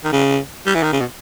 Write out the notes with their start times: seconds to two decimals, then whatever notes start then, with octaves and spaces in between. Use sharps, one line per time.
0.05 D#3
0.12 C#3
0.66 G3
0.75 E3
0.83 D#3
0.93 C#3
1.00 B2